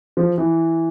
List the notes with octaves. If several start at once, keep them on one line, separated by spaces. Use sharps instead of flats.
F3
E3